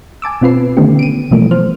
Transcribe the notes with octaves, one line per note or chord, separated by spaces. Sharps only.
G#5 A5 D6 E6
B2 C4 F4 B4 C7
D3 D#3 A3 B3 C#4 G4
D7 D#7
B2 E3 F3 G3 A3 A#3
F3 C5 F6